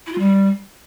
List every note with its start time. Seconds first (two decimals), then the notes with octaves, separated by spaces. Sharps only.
0.06 E4
0.12 F4
0.18 G3